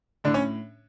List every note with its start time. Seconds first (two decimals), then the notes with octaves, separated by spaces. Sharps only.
0.24 A2 D3 D4
0.34 C#4 C#5